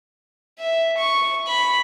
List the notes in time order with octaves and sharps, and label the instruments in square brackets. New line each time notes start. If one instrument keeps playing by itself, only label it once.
[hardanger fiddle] E5
C#6
B5